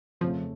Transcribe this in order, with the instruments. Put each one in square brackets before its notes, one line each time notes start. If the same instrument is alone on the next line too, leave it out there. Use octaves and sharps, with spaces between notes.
[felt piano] F2 C#3 A3 [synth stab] F3